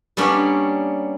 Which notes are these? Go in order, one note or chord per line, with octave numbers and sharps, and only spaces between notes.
G3 A#3 B3 C#4 D4